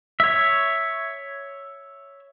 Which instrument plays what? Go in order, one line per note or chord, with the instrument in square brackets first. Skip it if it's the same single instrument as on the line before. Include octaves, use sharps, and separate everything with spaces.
[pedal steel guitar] C#5 E5